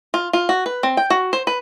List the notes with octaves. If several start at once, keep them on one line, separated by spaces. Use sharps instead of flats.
F4
F4
F#4
B4
C4
G5
F#4
C5
B4